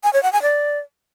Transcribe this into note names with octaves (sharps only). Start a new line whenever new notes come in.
G#5
C#5
F#5
G#5
D5